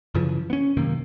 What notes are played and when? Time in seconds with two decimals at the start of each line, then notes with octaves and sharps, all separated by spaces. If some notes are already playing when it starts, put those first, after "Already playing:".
0.15 F#2 C#3 E3 F3
0.50 B3 C#4
0.77 F#2 C3 D#3 A#3